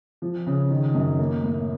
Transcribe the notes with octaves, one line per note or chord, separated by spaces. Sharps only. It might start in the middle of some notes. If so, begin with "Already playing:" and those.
F3
C#3
D#3
F#2
A#3
A2